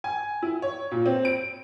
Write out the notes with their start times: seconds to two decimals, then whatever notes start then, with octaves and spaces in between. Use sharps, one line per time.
0.04 G#5
0.42 E4
0.62 C#5
0.91 A#2
1.06 C4
1.25 D7